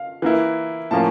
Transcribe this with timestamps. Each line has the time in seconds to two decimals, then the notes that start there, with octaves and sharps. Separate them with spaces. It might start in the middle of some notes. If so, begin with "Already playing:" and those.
Already playing: F5
0.22 E3 A#3 E4
0.91 A2 F3 A#3 C#4 A5